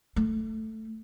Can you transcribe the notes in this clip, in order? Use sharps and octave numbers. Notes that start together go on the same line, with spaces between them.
A3